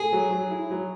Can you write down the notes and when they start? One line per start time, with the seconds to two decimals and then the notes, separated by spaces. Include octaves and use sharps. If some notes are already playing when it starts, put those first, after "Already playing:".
Already playing: G#4
0.12 F#3
0.31 F#3
0.51 E4
0.71 F#3